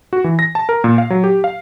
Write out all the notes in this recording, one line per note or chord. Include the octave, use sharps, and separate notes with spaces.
F#4
E3
A#6
A5
A#4
A#2
F5
F#3
G4
F5